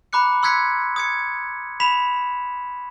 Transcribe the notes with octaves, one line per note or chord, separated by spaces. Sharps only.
A#5 B5 D6 F#6 C#7
C6 E6 F#6 G#6 B6 C#7
D#6 G#6 C#7
B5 B6 E7 F7